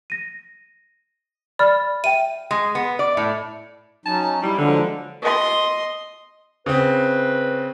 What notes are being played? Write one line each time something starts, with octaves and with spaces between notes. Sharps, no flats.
A#6 D#7
D5 B5 F6
E5 G5 D#7
G#3
B3
D5
A2
F#3 C#4 D#4 A5
G3 E4
D3 F3 F#3 G#3
D#5 C6
C#3 C4 B4